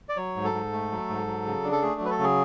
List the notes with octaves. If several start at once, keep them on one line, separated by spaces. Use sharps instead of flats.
D5
F#3 C#5
G#2
A4
G#2
A3
F#3
G#2
F#3
C#3
D4
A4
A3 G#4
F#3 B4
A4
C#3
G#4